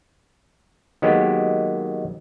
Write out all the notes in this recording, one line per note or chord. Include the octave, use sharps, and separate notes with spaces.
D#3 F#3 G#3 A#3 B3 G4